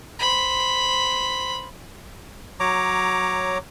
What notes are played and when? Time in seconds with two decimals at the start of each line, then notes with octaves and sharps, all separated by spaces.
0.19 C5 B5
2.60 F#3 C#5 A#5 D6